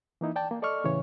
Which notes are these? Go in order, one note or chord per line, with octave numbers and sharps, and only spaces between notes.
E3 A#3 D#4 E4
D5 G5 A5
A#3
A4 D5 D#5 C#6 F6
A2 C#3 E3 C#5